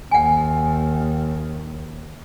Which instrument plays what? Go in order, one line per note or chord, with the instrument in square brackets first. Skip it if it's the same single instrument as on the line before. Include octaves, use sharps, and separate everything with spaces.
[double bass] D#2 [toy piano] F#5 G#5